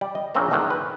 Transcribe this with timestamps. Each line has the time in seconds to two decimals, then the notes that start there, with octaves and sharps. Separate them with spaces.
0.01 G3 D5
0.15 D#5
0.35 A#1 A#2 C#3 C4 C5 A#5
0.50 E2 G#2 D3 D#3
0.70 B4